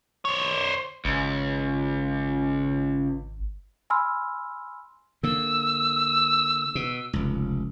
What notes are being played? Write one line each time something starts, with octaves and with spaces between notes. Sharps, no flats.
C5 C#5
G#1 C#2
G#5 B5 C6 E6 F6
D3 A#3 E6
B2
F1 C#2